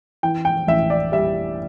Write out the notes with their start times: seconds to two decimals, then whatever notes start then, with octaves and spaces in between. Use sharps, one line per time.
0.23 E3 G5
0.45 G5
0.67 A1 E5
0.90 D5
1.12 G3 E5